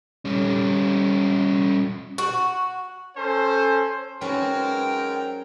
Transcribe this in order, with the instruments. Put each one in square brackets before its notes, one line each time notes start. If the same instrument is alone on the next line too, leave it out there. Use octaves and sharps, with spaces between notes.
[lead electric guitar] G3 C#4
[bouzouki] F#4
[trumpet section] C#4 A4 C5
[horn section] G#2 F#3 A#4 [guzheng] C#4 B4 [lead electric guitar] G5 C6